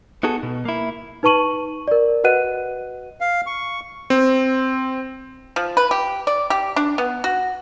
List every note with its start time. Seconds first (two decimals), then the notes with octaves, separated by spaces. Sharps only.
0.23 B3 D#4 F#4 G#4 A4
0.43 B2
0.65 A#3 E4
1.23 D#4 B4 A5 C#6 D#7 F#7
1.88 A#4 D5
2.24 F#4 B4 D#5 F#5 F#6 D#7
3.21 F5
3.46 C#6
4.10 C4
5.56 F3
5.77 B4
5.91 G4
6.27 D5
6.50 G4
6.76 D4
6.98 B3
7.24 F#4